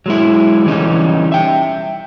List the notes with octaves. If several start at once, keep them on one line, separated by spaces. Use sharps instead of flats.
F#3 G#3 E4
E3 G3 C#4 D#4
E5 G5